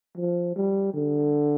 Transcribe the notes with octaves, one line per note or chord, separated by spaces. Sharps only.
F3
G3
D3